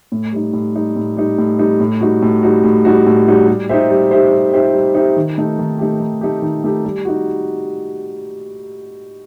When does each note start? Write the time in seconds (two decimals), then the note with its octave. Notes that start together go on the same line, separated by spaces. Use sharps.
0.12 A2
0.32 G3 D#4
0.53 A2
0.75 G3 D#4
0.96 A2
1.17 G3 D#4
1.38 A2
1.59 G3 D#4
1.80 A2
2.01 G3 D#4 F#4
2.22 A2
2.43 G3 D#4 F#4
2.64 A2
2.85 G3 D#4 F#4
3.06 A2
3.27 G3 D#4 F#4
3.48 G3
3.69 D#4 G4 C5 E5
3.90 G3
4.11 D#4 G4 C5 E5
4.31 G3
4.53 D#4 G4 C5 E5
4.73 G3
4.94 D#4 G4 C5 E5
5.17 D#3
5.38 A3 D#4 G4
5.59 D#3
5.79 A3 D#4 G4
6.00 D#3
6.21 A3 D#4 G4
6.42 D#3
6.64 A3 D#4 G4
6.84 G3
7.05 D#4 F#4